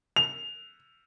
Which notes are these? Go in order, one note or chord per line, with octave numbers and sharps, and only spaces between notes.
F7